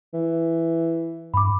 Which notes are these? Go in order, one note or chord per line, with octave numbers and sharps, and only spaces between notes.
E3
G2 B5 D6